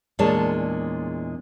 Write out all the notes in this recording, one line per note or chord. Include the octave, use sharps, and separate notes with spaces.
E2 A#2 G#3 D4 C#5 A5